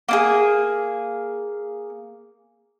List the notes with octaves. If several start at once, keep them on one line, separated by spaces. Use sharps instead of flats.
A#3 D4 G#4